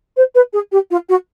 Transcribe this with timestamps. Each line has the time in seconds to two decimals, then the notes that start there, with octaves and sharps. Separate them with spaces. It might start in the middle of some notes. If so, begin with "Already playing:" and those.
0.16 C5
0.35 B4
0.53 G#4
0.71 G4
0.90 F4
1.09 F#4